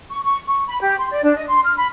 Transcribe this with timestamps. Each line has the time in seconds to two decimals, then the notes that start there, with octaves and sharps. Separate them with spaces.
0.10 C#6
0.24 C#6
0.46 C#6
0.67 B5
0.80 G4
0.98 C6
1.11 D5
1.23 D4
1.36 D#5
1.47 C6
1.64 F6
1.76 B5